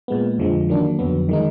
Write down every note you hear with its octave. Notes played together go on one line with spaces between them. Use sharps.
A#2 G#3 B3
F2 D3 F3 G#3
D#3 F#3 A#3 D4
F2 D3 F#3 B3
D#3 G#3 D#4